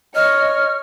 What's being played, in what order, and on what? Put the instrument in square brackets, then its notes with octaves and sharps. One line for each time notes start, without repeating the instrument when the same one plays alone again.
[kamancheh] C#5 [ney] D#5 [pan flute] F6